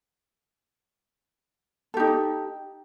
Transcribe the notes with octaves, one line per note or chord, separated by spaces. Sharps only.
D#4 G4 A4